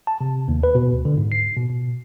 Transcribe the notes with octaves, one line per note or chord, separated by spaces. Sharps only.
A5
C3
D#2
B4
B2
D2
D3
G#2
C7
B2
B2